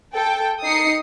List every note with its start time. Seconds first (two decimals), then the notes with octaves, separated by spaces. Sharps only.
0.15 A4 G5
0.64 D#4 D#6 C7 C#7